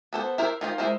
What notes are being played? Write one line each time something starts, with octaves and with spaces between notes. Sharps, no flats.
B3 A4 C5
E4 A#4 C5 C#5 E5
D#3 F4 C5
G#3 E4 A#4 C5